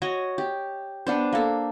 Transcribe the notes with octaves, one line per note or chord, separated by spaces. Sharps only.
F#4 C#5 D#5
G4
B3 D4 C5
A#3 A4